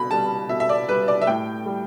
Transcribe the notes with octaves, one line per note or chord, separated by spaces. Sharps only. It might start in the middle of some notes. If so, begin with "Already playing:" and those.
Already playing: B2 B5
G3 A5
B2 E5
E5
D5
G3 B4
D5
E5
A2 G5
G3